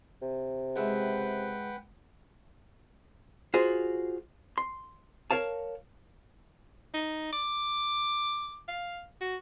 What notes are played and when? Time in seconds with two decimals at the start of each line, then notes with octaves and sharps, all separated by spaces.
0.22 C3
0.76 C#2 G#3 B4 E5 F#5 G5
3.54 F4 F#4 G#4 C5
4.58 C6
5.31 A#4 C#5 F5 A5
6.94 D#4
7.33 D6
8.68 F5
9.21 F#4